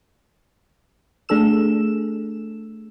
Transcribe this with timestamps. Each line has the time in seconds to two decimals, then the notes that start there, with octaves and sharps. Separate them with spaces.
1.29 A3 D4 G#4 A4 E6 E7